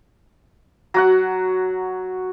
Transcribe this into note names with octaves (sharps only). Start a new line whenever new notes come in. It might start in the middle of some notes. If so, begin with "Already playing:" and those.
F#3 F#4 F#5